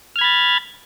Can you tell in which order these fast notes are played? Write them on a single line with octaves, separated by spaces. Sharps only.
F6 G#6 B5 A6